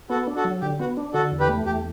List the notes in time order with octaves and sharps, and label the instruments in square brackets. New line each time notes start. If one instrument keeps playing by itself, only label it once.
[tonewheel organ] B3 [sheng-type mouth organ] F#4 A4
[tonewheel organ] D4
[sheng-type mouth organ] F#4 A4
[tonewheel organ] F#3
[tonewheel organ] D3 [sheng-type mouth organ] G4
[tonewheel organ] B3 [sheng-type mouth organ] F#4
[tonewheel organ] D4
[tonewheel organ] D3 [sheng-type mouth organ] F#4 A4
[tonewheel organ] E2
[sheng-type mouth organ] G4 B4
[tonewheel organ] A3
[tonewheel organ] E2 [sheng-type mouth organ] G4